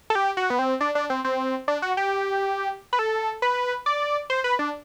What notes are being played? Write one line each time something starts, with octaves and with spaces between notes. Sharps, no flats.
A4
G4
F#4
B3
C4
D4
D4
C4
C4
D4
F#4
G4
B4
A4
B4
D5
C5
B4
D4